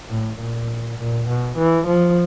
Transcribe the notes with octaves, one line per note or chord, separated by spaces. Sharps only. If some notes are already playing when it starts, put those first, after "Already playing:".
A2
A#2
A#2
B2
E3
F3